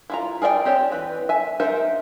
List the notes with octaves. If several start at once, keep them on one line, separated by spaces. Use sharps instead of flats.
E4 F4 A#5
G#4 A#4 D5 E5 G5
C4 G4 C#5
E3 B4
E5 G#5
D#4 A#4 C5 E5